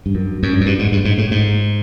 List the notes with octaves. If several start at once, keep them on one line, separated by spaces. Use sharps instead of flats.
G2
F#2
F#2
G2
F#2
G2
G#2
G2
G#2
A2
G#2